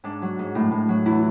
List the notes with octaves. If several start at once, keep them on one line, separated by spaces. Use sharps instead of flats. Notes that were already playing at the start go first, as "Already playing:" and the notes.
G#2 D4
F#3
G#2
A2
A2
F#3
E2 E4